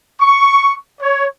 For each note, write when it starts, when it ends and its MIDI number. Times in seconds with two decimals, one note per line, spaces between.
0.20 0.76 85
1.01 1.26 73